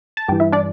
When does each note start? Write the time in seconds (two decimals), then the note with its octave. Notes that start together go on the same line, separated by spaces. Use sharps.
0.17 A5
0.28 G2 E3 G4 G5
0.40 E4 E5
0.52 D4 D5